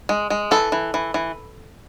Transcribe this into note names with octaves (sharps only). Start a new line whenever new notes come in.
G#3
G#3
E3 A4
E3
E3
E3